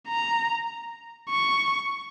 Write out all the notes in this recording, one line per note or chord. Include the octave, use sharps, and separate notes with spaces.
A#5
C#6